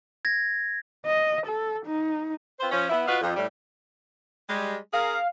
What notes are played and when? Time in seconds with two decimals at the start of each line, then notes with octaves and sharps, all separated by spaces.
0.25 G#6 A#6
1.06 D#5
1.47 A4
1.86 D#4
2.60 C4 F4 B4 C5
2.71 F3 C#4
2.90 B3 E4
3.07 F4 F#4 B4 D#5 F5
3.21 F2
3.36 A2 G3
4.49 G3 G#3
4.93 C#4 G#4 A#4 F5